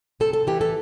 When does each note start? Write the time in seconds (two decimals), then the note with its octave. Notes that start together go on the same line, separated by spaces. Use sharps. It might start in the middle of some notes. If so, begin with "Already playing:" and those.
0.20 C3 A4
0.33 A4
0.47 E3 G4
0.61 A4